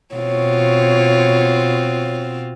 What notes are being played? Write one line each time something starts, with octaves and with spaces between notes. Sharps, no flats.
B2 C4 F4 C#5